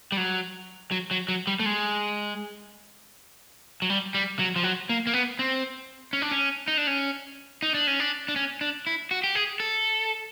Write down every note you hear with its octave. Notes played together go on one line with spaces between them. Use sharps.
G3
F#3
F#3
F#3
F#3
G3
A3
G#3
F#3
G3
G3
F#3
F3
F#3
A#3
A#3
B3
C4
C#4
D4
C#4
D#4
D4
C#4
D#4
D4
C#4
D4
D4
C#4
D4
E4
F#4
G4
G#4
A4